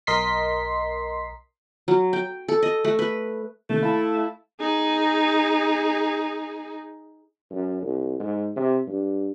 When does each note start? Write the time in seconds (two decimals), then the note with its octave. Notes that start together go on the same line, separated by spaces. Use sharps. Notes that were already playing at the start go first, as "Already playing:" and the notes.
0.07 B1 A#4 D#5 C6 B6 C7
1.88 F#3
2.13 G5
2.48 A4
2.63 D#5
2.84 A3
2.99 B4
3.70 C3 D#3 A3 A#3
3.83 E4 F5 A5
4.60 D#4 G#4
7.50 F#2
7.82 C2
8.20 G#2
8.56 C3
8.87 G2